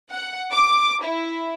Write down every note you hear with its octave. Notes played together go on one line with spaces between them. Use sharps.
F#5
D6
E4